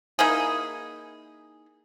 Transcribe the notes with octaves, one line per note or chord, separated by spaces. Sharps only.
A#3 D#4 E4 G#4